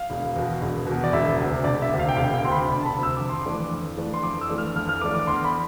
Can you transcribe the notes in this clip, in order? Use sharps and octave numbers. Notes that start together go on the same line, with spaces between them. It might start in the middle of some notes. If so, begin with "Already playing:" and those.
Already playing: F5
E1
E2 B2
E1
E2 B2
D5
E1 E5
D2 C3
E1 D5
E5
D2 C3
F5
G5
E1 F5
G5
D2 C3 C6
B5
E1 B5
A5
B5
D2 C3
E6
F2 D6
C6
E3 A3 D4 D6
F2
E3 A3 D4
C6
F2 D6
E6
E3 A3 D4
F6
F2 F6
F6
E3 A3 D4 D6
D6
E2 C6
B5